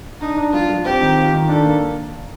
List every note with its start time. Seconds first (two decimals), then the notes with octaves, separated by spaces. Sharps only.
0.21 D4 D#4
0.37 D4
0.53 F3 F4
0.69 F3
0.85 C4 G4
1.00 D#3
1.17 F4
1.33 D#3
1.48 D4 A4
1.65 A#3